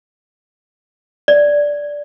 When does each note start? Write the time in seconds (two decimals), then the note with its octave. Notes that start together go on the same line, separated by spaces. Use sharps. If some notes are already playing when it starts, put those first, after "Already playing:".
1.28 D5